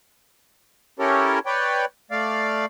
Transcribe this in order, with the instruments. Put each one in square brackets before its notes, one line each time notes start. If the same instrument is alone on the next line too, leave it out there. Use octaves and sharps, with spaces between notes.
[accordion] C#4 E4 G4 A4 A#4 C#5
B4 C#5 D5 G5
A3 D5 F5